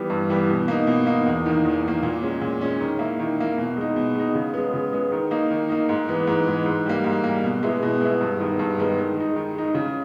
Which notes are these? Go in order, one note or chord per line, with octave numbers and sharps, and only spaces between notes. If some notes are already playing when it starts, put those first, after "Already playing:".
Already playing: E3 G3 B3
G2
E3 G3 B3
B2
A#3 D#4
B2
A#3 D#4
E2
D#3 A#3
E2
D#3 A#3
A#2
G#3 C#4
A#2
G#3 C#4
D#3
A#3 E4
D#3
A#3 E4
B2
G#3 D#4
B2
G#3 D#4
C#3
G#3 B3
C#3
G#3 B3
D#3
A#3 D#4
D#3
A#3 D#4
G#2
E3 G#3 B3
G#2
E3 G#3 B3
G#2
G3 A#3
G#2
G3 A#3
B2
G#3 B3 E4
B2
G#3 B3 E4
G2
D#3 G#3 B3
G2
D#3 G#3 B3
D#3
G#3 D#4
D#3
G#3 D#4
C#3